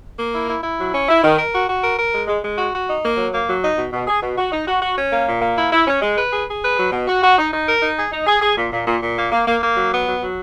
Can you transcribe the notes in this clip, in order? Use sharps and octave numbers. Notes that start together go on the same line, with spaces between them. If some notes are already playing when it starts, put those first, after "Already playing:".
A#3
E4
E4
E4
F#3
C#4
E4
D#3
A#4
F#4
F#4
A#4
A#4
G#3
G#3
G#3
F#4
F#4
D#4
A#3
F#3
A#3
F#3
D#4
B2
B2
G#4
B2
F#4
D#4
F#4
F#4
C#4
A#3
A#2
A#3
E4
E4
C#4
G#3
B4
G#4
G#4
B4
F#3
B2
F#4
F#4
D#4
D#4
A#4
D#4
G#4
D#4
G#4
G#4
A#2
A#2
A#2
A#2
A#3
A#3
A#3
A#3
F#3
B3
F#3
F#3